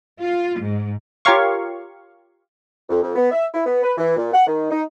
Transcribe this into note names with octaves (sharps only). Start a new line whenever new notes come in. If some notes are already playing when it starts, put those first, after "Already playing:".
F4
G#2
F4 G4 A#4 C#5 F5 C#6
F2
F2
B3
E5
E4
B3
B4
E3
A#2
F#5
D#3
D#4